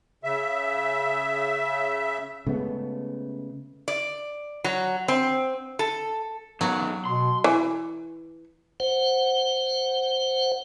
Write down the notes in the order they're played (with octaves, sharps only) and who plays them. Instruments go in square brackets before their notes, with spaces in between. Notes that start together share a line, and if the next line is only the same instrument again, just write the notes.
[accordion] C#3 E5
[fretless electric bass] C#3 G#3 A3 B3
[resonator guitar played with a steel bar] D5
F#3
C4
A4
[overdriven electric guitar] B2 D#3 [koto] F#3
[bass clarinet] B2 [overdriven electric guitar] C6
[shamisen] E3
[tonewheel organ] C5 F#5